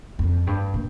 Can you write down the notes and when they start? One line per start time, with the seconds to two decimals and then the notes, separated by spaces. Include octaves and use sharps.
0.19 F2
0.47 G2
0.74 A#2